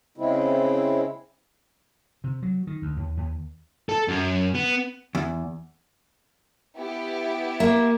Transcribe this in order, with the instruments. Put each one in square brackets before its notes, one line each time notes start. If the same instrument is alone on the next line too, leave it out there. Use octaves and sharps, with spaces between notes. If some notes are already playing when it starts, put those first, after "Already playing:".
[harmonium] C#3 G#3 C4 E4
[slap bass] C3
F#3
D#3
D2
D#2
D#2
[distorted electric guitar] A4
F#2
B3
[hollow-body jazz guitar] E2
[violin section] B3 E4 G4
[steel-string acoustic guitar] A#3 E5